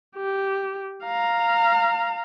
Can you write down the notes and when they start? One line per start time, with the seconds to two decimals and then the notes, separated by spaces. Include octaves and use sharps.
0.16 G4
1.04 F5 A#5